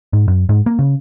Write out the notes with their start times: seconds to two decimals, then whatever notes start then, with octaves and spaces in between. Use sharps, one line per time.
0.13 G#2
0.28 F#2
0.49 G#2
0.66 A#3
0.79 C#3